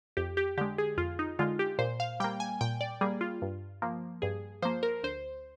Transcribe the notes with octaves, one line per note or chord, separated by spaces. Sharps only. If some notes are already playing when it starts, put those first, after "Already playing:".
F2 G4
G4
D3 G#3 G4
G#4
F2 F4
D#4
D3 G#3 F4
G4
A#2 C5
F5
G3 A#3 G5
G#5
A#2 G5
D5
G3 A#3 G#4
F4
G2
F3 A#3
G2 G#4
F3 A#3 C5
A#4
D2 C5